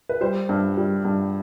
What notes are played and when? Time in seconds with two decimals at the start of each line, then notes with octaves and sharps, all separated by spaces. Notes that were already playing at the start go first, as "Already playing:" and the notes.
0.09 B4
0.21 G3 C5
0.49 G2
0.77 G3
1.05 G2